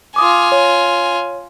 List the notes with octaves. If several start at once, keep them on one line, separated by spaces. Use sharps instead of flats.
F4 G#5 D6 D#6
C#5